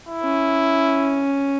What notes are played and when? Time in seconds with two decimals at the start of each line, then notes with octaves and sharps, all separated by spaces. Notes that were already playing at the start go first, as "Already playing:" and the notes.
0.09 E4
0.23 C#4